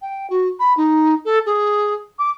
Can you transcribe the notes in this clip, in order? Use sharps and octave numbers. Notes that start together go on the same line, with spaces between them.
G5
F#4
B5
D#4
A4
G#4
D6